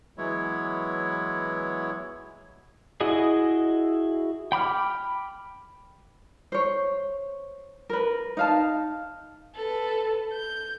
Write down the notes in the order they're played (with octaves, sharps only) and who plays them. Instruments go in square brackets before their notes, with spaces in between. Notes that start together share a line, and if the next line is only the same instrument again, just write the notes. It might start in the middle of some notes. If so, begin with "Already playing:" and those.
[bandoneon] E3 F#3 G#3 B3 E4 C#5
[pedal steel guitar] E4 F#4 G#4 D#5
G5 B5 D6 F6
[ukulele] C5 C#5
A#4 B4
D#4 F5 A5
[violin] A4 B4
G6